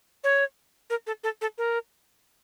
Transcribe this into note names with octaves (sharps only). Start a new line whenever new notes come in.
C#5
A#4
A4
A4
A4
A#4